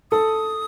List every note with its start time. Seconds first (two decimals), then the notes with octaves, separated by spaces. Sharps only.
0.11 A4 D#6